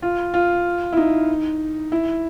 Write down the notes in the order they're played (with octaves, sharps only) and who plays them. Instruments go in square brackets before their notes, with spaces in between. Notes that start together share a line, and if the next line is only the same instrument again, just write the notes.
[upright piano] F4
F4
E4
D#4
E4